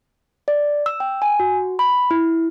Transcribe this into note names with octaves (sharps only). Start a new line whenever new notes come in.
D5
E6
G5
G#5
F#4
B5
E4